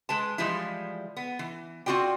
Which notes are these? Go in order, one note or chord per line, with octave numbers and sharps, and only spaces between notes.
G#3 B4 A5
E3 F3 G3 G#3 E4
B3
E3
C4 F4 F#4 D5 G5